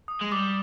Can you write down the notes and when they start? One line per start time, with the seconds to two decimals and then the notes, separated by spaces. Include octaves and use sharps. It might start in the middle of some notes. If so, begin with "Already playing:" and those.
0.08 D#6
0.22 G#3
0.32 G3 D6